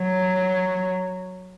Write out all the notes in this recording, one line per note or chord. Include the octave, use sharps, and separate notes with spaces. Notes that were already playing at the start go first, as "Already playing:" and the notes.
Already playing: F#3